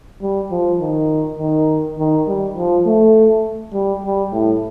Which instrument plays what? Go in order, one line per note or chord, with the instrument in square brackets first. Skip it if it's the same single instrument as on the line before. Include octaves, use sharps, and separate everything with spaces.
[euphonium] G3
F3
D#3
D#3
D#3
G3
F3
A3
G3
G3
A2